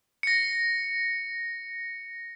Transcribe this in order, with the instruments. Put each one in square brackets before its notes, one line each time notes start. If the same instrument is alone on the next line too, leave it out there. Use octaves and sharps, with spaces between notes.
[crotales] A#6 C#7